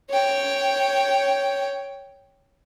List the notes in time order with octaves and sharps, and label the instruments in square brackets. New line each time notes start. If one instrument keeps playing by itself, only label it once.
[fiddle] C#5 G5